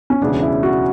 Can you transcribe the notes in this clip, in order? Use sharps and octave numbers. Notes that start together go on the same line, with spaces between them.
C#4
E1 D2 C#3 E3 D4
E4
F#4